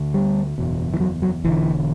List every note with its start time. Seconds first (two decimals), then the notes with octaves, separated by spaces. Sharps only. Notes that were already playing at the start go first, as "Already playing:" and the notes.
Already playing: D2 D3
0.14 G3
0.58 F#1 E2 B2
0.94 E3
1.00 F#3
1.22 F#3
1.44 E1 E2 D3 E3